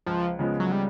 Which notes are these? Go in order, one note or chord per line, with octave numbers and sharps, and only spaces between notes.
C#2 F3
C#3 F3 G#3 B3
F#3
G3